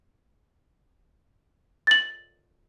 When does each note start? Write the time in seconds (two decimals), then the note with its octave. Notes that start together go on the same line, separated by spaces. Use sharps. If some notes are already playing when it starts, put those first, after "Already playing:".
1.87 A6 F#7